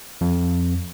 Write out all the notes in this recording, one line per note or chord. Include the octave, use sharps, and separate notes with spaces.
F2